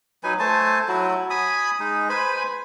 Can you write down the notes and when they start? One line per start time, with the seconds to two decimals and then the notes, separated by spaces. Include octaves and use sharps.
0.23 F#3 D#4 B4 G#5
0.40 A3 C5 G#5 A5
0.88 F#3 E4 F#4
1.30 G#5 B5 D#6
1.80 G#3 D#4
2.09 B4 C5 G#5 B5